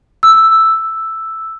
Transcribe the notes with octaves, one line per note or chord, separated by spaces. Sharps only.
E6